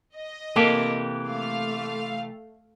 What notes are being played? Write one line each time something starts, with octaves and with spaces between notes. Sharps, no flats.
D#5
C3 E3 A#3 G4 A4
A3 F5